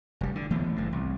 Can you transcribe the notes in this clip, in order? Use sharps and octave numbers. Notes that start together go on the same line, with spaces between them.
F1 G3
D3
E3 A3 B3
F#1 A2
C2